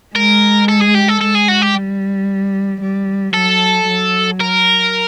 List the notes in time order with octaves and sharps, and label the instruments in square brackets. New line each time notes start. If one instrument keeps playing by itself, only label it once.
[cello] G#3 [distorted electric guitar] A#4
[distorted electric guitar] A4
G#4
G4
A4
[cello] G#3 [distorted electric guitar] A4
[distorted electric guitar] G#4
F#4
G4
[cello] G3
G3
[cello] F#3 [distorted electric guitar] A4
[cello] F#3
[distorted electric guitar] A#4